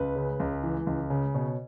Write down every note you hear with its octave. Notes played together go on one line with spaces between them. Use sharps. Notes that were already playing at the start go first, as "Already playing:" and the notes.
Already playing: C#2 B4
C#3
C#2
E3
C#2
C#3
B2 C#5